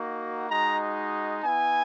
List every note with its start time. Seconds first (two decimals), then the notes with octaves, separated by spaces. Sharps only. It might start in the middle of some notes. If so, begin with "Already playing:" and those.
Already playing: A#3 D#4 F#4
0.49 G#3 D#4 F#4 A#5
1.44 B3 E4 G#5